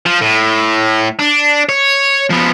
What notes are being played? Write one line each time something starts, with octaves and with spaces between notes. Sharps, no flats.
F3
A2
D4
C#5
F3 B3